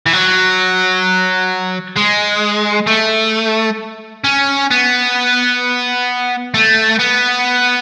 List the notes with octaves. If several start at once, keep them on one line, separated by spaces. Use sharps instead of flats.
E3
F#3
G#3
A3
C#4
B3
A3
B3